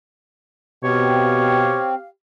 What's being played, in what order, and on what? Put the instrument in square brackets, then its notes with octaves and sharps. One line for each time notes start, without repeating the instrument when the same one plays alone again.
[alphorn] B2 [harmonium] C4 [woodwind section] G4 F5 [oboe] C#5